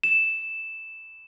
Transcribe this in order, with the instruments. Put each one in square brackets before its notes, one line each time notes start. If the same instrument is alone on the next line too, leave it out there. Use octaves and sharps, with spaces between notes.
[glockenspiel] E7